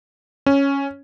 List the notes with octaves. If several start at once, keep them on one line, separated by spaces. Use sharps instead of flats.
C#4